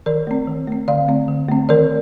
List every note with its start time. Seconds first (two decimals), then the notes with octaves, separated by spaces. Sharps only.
0.06 D#3 A#4 D5
0.27 A3 C4
0.47 D#3
0.68 A3 C4
0.88 D3 D5 F5
1.08 A3 C4
1.28 D3
1.48 A3 C4
1.69 D#3 A#4 D5